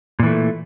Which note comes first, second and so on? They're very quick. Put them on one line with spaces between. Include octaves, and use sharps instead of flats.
A#2 E3 A3